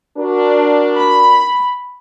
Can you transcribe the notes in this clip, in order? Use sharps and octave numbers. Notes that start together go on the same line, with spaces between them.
D4 F#4 A#4
B5